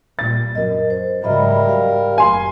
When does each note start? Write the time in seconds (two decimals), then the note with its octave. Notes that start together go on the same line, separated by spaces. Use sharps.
0.19 A#2 G3 A6
0.55 F#2 A#4 D#5
0.90 C5
1.24 G#2 C#3 F#3 G3 A#4 D#5 E5 B5
1.69 G4 F5
2.18 F#1 G#5 C6